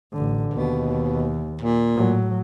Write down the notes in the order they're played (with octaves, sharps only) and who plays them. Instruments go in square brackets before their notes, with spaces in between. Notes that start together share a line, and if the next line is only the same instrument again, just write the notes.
[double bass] A1 D3
[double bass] D#2 [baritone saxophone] B2
[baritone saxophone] A#2
[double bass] A2 F#3